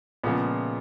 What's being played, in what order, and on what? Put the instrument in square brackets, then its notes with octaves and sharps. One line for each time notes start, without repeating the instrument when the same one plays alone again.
[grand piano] A#2 [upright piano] C#3 F3 G#3 B3